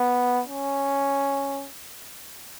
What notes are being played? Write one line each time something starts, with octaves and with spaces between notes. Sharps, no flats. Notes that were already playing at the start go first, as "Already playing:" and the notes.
Already playing: B3
C#4